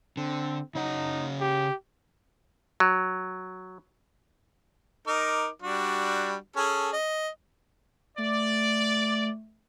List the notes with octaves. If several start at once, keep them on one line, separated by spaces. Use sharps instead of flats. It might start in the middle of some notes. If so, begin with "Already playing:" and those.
D3 C4
C#3 D#4 C#5 F#5
G4
F#3
D#4 A#4 D6
G3 D4 F#4
C#4 G#4 A4
D#5
A3 D5